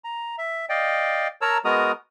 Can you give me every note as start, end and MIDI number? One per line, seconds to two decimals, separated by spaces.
0.04 0.36 82
0.38 0.66 76
0.69 1.28 74
0.69 1.28 75
0.69 1.28 77
0.69 1.28 79
1.41 1.58 70
1.41 1.58 73
1.41 1.58 81
1.41 1.58 82
1.41 1.58 88
1.65 1.92 56
1.65 1.92 59
1.65 1.92 66
1.65 1.92 70
1.65 1.92 82
1.65 1.92 87